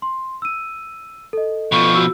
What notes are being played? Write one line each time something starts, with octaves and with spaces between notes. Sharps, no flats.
C6
E6 D#7
A4 D#5
B2 F3 C#6
F#4 E6